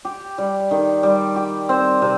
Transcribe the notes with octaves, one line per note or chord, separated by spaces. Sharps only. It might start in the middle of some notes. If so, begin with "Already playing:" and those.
G4
G3
D#3
G3
G4
C4
C3